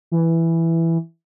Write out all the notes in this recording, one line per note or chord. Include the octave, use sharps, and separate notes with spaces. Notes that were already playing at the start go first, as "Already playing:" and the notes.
E3